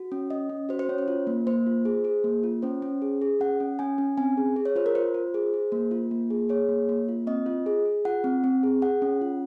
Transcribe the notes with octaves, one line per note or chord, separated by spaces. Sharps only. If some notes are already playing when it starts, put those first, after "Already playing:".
Already playing: F#4
C#4
C#4 D#5
C#4
F#4 C5
C5
C#4 C#5
C5
F4
A#3
A#3 C5
F4
G#4
G#4
A#3
F4
C#4 C5
C#4
G#4
G#4
C#4 F#5
C#4
C#4 G#5
C#4
C4 G#5
G#4
G#4
C#5
F4 C5
A#4
F4 C5
F4
G#4
G#4
A#3
F4
A#3
G#4
G#4 C#5
A#3
A#3
F4
C4 D#5
F4
G#4
G#4
F4 F#5
C4
C4
G#4
G#4 F#5
C#4
F4